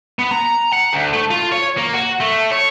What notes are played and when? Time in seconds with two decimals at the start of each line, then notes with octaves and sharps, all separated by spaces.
0.19 B3
0.31 A#5
0.73 F#5
0.93 D2
1.13 A3
1.30 F4
1.52 C#5
1.77 A#3
1.94 F#4
2.20 A3
2.51 C#5